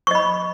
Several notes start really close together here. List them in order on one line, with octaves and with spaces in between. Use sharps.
C#6 D#5 B5